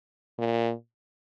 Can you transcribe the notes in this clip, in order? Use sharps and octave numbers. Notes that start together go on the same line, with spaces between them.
A#2